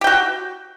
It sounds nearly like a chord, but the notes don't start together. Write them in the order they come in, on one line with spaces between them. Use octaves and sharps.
G4 G5 F#4